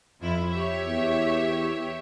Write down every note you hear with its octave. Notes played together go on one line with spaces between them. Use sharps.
F2 E4
G4 C#5 E5
E2